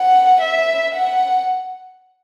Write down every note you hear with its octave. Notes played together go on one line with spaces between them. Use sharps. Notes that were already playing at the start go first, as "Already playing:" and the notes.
Already playing: F#5
E5
F#5